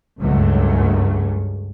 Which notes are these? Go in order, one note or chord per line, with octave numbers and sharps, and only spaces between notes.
C#2 G2 C#3 F#3 A3